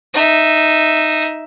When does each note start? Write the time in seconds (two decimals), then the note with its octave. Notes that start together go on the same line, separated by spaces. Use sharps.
0.14 D#4 E5